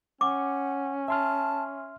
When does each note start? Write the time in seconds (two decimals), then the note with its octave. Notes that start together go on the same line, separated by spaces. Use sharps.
0.21 C#4 F#5 D6
1.08 E5 A5 C6 F6